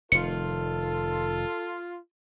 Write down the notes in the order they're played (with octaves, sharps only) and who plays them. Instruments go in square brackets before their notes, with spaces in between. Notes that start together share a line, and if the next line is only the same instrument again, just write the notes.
[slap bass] F1 D#3 [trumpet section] F4 [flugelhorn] A4 [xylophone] C#7